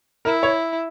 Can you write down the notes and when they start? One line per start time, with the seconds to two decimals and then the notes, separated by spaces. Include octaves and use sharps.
0.25 E4 A#4
0.43 C#5